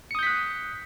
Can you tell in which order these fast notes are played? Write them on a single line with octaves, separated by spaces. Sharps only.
C#7 D#6 G6 B6 F#6